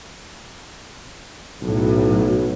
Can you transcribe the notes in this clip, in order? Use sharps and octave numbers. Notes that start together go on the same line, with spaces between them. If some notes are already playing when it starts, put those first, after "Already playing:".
B1 A2 F#3